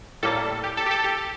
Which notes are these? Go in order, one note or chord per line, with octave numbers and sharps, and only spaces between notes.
A2 G3 A#3 A4
G4
A4
G4
A4
G4